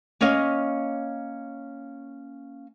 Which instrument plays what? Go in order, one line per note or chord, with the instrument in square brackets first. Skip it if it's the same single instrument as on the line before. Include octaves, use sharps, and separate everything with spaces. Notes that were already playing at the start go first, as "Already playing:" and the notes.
[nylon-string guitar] A#3 C#4 C#5 D#5 F5